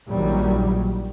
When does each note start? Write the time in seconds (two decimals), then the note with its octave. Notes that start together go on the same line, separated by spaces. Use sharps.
0.10 A#1 D#3 F#3 G3